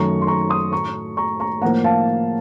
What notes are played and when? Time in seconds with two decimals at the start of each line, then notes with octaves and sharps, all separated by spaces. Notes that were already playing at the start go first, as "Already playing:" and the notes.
Already playing: F#2 D#3 A3 A#5 C#6
0.21 C6
0.27 A#5 C#6
0.49 C6 D#6
0.72 A2 F#3 A3 A#5 C#6
1.17 A#5 C#6
1.40 A#5 C#6
1.62 A2 F3 A#3 F#5 A#5
1.84 F5 A5